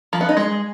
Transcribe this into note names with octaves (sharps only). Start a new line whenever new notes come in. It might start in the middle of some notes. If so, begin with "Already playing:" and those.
F3
B3
D#4
G#3